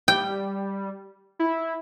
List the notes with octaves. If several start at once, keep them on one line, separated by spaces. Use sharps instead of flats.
G3 G5
E4